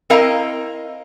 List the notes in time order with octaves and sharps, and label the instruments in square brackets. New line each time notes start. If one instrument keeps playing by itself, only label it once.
[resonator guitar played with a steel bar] C4 E4 A#4 D#5 F5 A#5